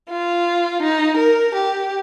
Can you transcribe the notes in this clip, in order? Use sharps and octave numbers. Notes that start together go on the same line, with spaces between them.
F4
D#4
A#4
G4